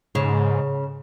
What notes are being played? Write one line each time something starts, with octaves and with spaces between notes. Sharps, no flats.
G#2 C#3